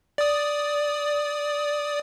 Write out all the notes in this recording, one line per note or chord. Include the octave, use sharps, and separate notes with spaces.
D5 D#6